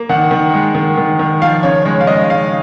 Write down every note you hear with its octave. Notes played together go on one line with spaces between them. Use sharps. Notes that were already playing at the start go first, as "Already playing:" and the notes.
Already playing: A#3
D#3 F#5
D#3
G#3
D#3
D#3
D#3
F3 F5
C#3 C#5
G#3 C#5
F5
G#3 D#5
C#3 F5